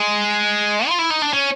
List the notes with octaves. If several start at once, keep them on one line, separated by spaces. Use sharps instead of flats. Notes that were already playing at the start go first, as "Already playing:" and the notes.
Already playing: G#3
F4
E4
D#4
D4
C#4